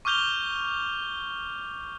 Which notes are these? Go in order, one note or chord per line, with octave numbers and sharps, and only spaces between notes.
C#6 D6 F6 G6 F7 G7